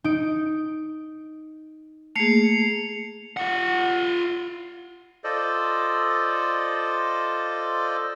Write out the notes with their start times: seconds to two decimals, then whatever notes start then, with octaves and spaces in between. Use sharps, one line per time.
0.04 D#4 D7
2.16 A3 A#3 G#4 C7 C#7 F7
3.37 F4 F#5
5.24 F4 A4 C5 D5 D#5